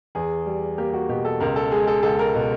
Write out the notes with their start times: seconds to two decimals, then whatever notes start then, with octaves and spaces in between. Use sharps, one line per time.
0.15 E2 G#4
0.46 G3
0.78 A#3 G4
0.93 F#4
1.09 B2 G4
1.25 A4
1.40 C#2 A#4
1.56 A4
1.71 G#3 G#4
1.87 A4
2.03 C#2 A4
2.19 A#4
2.35 B2